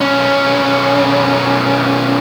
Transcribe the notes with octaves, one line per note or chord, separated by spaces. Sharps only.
B1 C#4